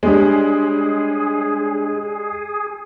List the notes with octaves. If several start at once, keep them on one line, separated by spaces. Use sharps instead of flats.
G3 G#3 D4 G#4 C#5